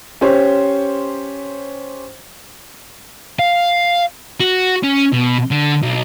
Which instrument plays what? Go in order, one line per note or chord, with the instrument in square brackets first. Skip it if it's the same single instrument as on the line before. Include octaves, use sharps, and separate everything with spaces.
[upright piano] C#4 G4 C5 C#5
[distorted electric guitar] F5
F#4
C#4
B2
D3
B1